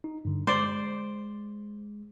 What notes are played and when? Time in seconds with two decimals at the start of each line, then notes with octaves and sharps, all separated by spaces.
0.04 D#4
0.25 G2 D3
0.47 G#3 C5 D5